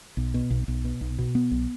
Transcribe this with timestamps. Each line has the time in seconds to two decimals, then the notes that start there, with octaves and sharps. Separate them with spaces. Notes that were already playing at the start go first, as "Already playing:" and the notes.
0.17 B1
0.34 B2
0.50 B1
0.68 B1
0.84 B2
1.01 B1
1.19 B2
1.35 B3
1.51 B1